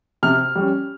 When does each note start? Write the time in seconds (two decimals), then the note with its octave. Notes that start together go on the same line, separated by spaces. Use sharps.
0.23 C3 F6
0.55 G3 C#4